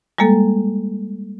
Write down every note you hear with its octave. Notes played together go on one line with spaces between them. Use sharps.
G3 G#3 A#3 A4